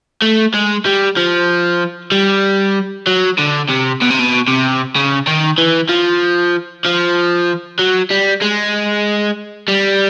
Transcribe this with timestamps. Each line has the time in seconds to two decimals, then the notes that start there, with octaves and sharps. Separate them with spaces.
0.22 A3
0.54 G#3
0.86 G3
1.17 F3
2.12 G3
3.07 F#3
3.38 D3
3.69 C3
4.02 B2
4.10 C3
4.19 B2
4.48 C3
4.96 C#3
5.27 D#3
5.58 E3
5.89 F3
6.85 F3
7.79 F#3
8.10 G3
8.41 G#3
9.68 G3